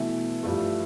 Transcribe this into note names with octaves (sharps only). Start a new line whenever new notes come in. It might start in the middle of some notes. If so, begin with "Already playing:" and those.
Already playing: B2 E3 A3 E4
G2 F3 A3